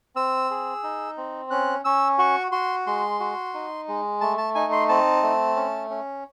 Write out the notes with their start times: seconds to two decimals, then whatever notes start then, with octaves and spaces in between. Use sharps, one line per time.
0.16 C4 E6
0.51 G#4
0.83 D#4
1.17 C4
1.51 C#4 F#6
1.84 C#4 E6
2.18 F#4 C#6
2.52 F#4 C6
2.87 G#3 C6
3.20 F#4
3.54 D#4
3.88 G#3
4.21 A3 A5
4.38 A5
4.55 D#4 G#5
4.72 C6
4.89 C4 A5
5.23 A3
5.56 C#4
5.90 C#4